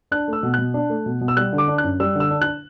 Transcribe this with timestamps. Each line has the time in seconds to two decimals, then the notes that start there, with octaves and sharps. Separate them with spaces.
0.11 D4 F#6
0.28 A3
0.33 E6
0.43 B2
0.54 B2 F#6
0.74 D4
0.90 A3
1.06 B2
1.21 B2
1.28 E6
1.37 G3 F#6
1.53 D3
1.58 D6
1.68 D4
1.78 F#6
1.84 F#2
2.00 G3 E6
2.15 D3 E6
2.31 D4
2.42 F#6